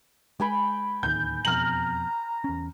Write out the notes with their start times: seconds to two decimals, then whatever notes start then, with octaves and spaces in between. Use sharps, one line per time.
0.40 G#3 G5 G#5 B5
1.03 D1 D#2 D#3 G6
1.45 E1 F2 B2 A#5 F6 F#7
2.44 E2 C#4